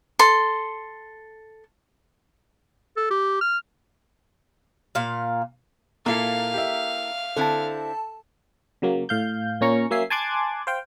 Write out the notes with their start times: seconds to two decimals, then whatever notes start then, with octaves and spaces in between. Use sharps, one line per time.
0.19 A4 C6
2.97 A4
3.10 G4
3.41 F6
4.95 A#2 F5
6.06 A#2 A#3 E4 A4 F5 A#5
6.54 G4 E5
7.37 D3 C4 E4 A4 A5
8.82 C#3 F#3 A#3
9.09 A2 F5 G6
9.61 A#2 A#3 C#4 A#5 C#6
9.91 F#3 A#3 C#4 E5 G#5 C7
10.10 G#5 A5 C6 D6 F#6 G#6
10.67 C5 F5 G5